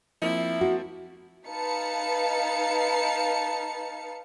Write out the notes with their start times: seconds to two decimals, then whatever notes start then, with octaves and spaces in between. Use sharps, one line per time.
0.22 F3 A#3 C4 E4
0.61 F#4
1.46 D#4 B4 F5 A5 C#7